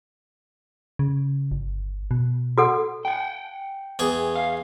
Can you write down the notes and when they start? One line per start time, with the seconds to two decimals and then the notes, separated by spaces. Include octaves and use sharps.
0.99 C#3
1.51 G1
2.11 B2
2.58 F#4 A4 F#5
3.05 F#5 G5
3.99 E2 G#4
4.36 F5